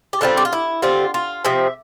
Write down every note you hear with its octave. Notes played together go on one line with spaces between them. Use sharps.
G4
D3 G3 C4 F4
G4
F4
E4
D3 G3 C4 F4
F4
C3 F3 C4 E5